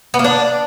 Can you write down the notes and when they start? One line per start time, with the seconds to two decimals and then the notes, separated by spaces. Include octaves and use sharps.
0.14 B3
0.19 A#3
0.24 D4